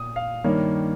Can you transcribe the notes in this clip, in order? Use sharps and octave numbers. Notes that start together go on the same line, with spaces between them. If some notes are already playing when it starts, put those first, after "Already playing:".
Already playing: A#2 D#6
F5
G2 D#3 G3 A#3 C#5